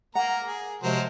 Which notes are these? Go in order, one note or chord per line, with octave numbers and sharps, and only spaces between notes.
A#3 F#5 A#5
G#4
C3 F3 F#3 G#3 A#4 C5